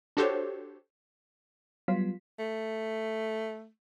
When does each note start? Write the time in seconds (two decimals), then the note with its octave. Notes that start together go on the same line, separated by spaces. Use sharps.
0.17 D4 F#4 G4 A4 C5 C#5
1.88 F#3 G3 B3 F4 B6
2.39 A3